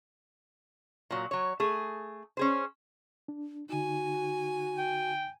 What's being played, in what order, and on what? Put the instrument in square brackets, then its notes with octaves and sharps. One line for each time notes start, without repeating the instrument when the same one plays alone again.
[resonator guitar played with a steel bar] A#2 F#3
F#3 C#5
A3 G#4
C#4 G#4 C5
[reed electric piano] D4
[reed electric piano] D3 D#4 [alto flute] F#4 [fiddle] G#5
[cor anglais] G5